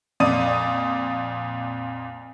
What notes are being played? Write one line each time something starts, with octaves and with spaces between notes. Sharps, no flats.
F2 A#2 D5 D#6 D#7